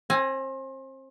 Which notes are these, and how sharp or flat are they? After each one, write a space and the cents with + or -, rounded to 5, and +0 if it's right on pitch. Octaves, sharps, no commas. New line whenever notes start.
C4 +35 G#5 +0